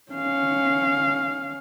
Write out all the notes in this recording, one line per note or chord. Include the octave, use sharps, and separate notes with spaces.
C#4 F5